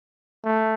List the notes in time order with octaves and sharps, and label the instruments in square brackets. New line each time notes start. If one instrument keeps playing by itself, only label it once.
[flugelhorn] A3